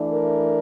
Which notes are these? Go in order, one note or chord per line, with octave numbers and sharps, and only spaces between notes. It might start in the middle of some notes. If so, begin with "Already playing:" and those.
Already playing: E3 A3 D4
A#4